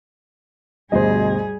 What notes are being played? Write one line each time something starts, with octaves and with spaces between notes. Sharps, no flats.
D2 G2 B2 G3 G#4 C5 D#5